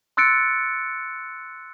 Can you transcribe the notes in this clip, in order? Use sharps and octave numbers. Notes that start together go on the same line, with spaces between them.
C6 E6 F#6 A6 C#7 D7